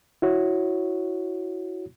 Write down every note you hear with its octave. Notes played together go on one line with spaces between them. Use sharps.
E4 F#4 C#5